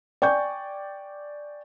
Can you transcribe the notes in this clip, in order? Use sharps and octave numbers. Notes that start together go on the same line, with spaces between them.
D5 G5 G#5 C#6 G6